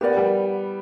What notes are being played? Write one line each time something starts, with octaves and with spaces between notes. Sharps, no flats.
B3 G4 A#4 D5 F#5
G3